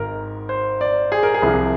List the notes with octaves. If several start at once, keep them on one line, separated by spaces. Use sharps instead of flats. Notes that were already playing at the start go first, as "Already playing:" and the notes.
Already playing: G#1 G#2 D#3 A#4
C5
D5
G#4
A#4
G#4
C2 C3 F3